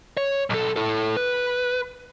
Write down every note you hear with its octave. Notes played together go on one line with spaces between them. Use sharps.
C#5
B1 A4
E4 A4
B4